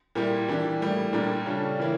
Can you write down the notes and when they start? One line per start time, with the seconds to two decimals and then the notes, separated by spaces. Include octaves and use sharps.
0.15 A#2 G3 A#3 E4 G4
0.48 E3 A#3 D4 G4
0.80 A2 G3 A#3 E4
1.13 A#2 G3 D4 G4 A#4
1.46 C#3 G3 D4 A4
1.79 C#3 E3 A#3 E4